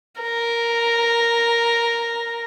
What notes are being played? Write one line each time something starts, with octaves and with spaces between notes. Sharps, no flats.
A#4